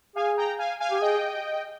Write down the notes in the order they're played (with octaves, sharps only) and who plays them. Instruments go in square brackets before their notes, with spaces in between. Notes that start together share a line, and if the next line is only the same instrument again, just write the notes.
[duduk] G#4 [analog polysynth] F5 G#5
[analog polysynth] G5 A#5
F5 G#5
F5 G#5
[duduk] G4 [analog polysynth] G#5
[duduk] G#4 [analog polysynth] D#5 G5